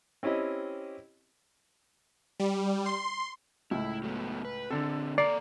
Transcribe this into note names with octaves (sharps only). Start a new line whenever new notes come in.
C4 C#4 E4 G4 D#5
G3
C6
C#2 A2 E4
F#3 A3 B3
B4
A#2 D3 C4 A4
A#3 A4 D5 A#5 C7